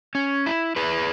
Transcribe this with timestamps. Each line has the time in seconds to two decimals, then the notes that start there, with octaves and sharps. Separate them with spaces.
0.15 C#4
0.46 E4
0.76 E4 G#4 B4